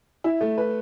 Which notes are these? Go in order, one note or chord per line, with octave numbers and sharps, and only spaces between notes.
E4
A3
B4